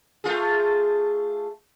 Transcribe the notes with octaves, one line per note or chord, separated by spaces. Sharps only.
A3 F4 G#4